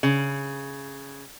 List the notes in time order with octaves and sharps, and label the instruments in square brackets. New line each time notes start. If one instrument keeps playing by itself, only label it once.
[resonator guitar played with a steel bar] C#3